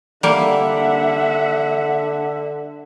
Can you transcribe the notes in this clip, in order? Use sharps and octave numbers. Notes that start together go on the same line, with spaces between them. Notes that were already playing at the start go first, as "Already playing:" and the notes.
D3 G3 A#3 E5 F#5